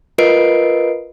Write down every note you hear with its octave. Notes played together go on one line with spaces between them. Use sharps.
F4 A#4 B4 D#5 C7 D7